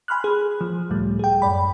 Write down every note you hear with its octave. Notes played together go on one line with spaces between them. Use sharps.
G#5 B5 C6 F6 F#6
G#4
F3
C#2 A2 G3 A3
G#4 G5
A1 F#2 D5 B5